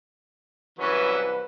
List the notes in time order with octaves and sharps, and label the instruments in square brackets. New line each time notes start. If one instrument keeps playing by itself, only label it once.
[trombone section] C2 B4 [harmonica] E3 F#3 C#4